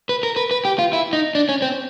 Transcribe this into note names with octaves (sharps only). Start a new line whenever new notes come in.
B4
A#4
B4
B4
G4
F4
E4
D#4
D4
C#4
C4